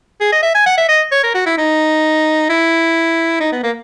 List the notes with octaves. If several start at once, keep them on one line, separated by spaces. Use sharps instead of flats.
G#4
D#5
E5
G#5
F#5
E5
D#5
C#5
A#4
F#4
E4
D#4
E4
D#4
B3
A#3